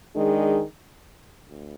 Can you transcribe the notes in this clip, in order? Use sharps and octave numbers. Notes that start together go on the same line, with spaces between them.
D#3 G#3 D4 G#4
D2